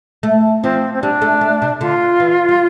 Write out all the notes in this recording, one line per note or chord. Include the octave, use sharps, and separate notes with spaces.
A3
F3 C4
C4
G3 D4
A3
A3
C3
D3 F4
E3
G3